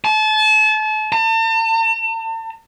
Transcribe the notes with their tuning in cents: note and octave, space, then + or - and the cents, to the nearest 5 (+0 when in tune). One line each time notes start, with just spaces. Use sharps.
A5 -35
A5 +40